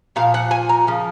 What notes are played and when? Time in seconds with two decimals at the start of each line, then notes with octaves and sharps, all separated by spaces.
0.16 A#2 F3 F5
0.34 F#5
0.51 G#5
0.69 A#5
0.87 C#3 F3